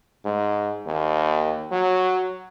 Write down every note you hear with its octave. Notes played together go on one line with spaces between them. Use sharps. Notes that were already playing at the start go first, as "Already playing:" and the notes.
G#2
D#2
F#3